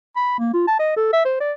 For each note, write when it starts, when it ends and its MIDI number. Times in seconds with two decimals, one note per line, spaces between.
0.16 0.37 83
0.39 0.52 58
0.53 0.65 65
0.68 0.76 81
0.79 0.94 75
0.97 1.12 69
1.13 1.24 76
1.25 1.36 72
1.40 1.52 74